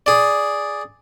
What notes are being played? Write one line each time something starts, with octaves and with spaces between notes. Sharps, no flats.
G#4 D5